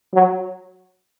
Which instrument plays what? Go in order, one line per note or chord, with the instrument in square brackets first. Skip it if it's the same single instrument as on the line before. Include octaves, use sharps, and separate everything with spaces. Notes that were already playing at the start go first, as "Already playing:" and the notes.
[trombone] F#3